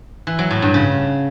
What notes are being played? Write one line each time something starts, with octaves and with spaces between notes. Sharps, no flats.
E3
F#3
A2
G2
C#3